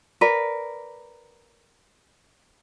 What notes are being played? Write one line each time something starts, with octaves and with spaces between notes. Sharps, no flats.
A#4 B4 D5